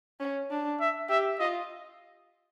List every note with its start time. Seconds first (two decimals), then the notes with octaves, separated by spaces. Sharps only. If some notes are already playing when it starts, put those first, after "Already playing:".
0.20 C#4
0.51 D4
0.80 E5
1.09 G4 E5
1.39 F4 D#5